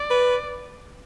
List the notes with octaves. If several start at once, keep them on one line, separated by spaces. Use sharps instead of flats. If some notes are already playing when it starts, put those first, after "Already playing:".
Already playing: D5
B4